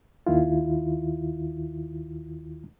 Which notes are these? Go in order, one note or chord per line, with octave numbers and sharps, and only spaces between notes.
D#2 D#3 E4 F4